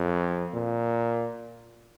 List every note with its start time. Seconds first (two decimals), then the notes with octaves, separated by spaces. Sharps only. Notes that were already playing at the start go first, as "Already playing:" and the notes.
Already playing: F2
0.54 A#2